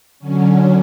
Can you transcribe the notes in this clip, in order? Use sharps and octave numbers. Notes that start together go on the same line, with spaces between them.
D3 F#3 C#4